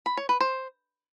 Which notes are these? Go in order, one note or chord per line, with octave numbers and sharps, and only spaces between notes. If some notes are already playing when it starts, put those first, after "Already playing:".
B5
C#5
B4
C5